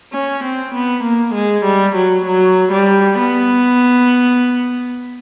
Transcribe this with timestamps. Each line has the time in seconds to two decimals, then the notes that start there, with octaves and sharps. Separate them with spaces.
0.13 C#4
0.44 C4
0.75 B3
1.04 A#3
1.35 G#3
1.65 G3
1.96 F#3
2.26 F#3
2.72 G3
3.18 B3